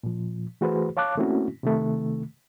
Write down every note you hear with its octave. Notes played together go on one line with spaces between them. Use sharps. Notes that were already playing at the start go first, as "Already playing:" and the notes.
A#2 F3
E3 A3 F#4 G#4 B4 C5
C#5 F5 A5 D6 F#6
A3 A#3 C4 C#4 E4 F#4
C3 D#3 A3